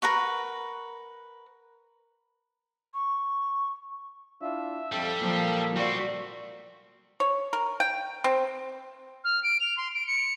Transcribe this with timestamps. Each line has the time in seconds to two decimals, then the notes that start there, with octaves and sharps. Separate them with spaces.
0.02 A#4 B4 F#5 C#6
2.94 C#6
4.41 D4 E4 F4 E5
4.92 F2 G3 A4
5.21 A#2 F3 A#3
5.76 G3 F#4 C5 D5
7.20 C#5
7.53 A#4
7.80 G5
8.24 C4
9.24 F6
9.43 D7
9.60 F7
9.77 C6
9.94 D7
10.06 C#7